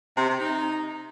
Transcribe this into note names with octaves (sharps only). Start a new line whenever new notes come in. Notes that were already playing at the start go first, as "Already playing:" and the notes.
C3
C3
D#4